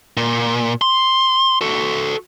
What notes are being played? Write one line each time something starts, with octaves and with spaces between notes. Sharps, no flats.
A#2
C6
F#4 A4